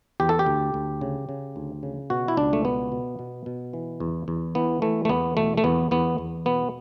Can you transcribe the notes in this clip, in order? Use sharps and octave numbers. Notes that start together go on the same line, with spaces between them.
E2 G4
A4
G4
D2
D2
C#3
C#3
D2
C#3
B2 F#4
E4
C#2 D4
A3
B2 B3
B2
B2
B2
E3
E2
E2
E3 B3
E3 A3
A3
E2 B3
B2 A3
A3
E2 B3
E2 B3
E2
B2 B3